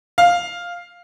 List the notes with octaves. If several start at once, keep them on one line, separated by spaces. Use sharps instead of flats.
F5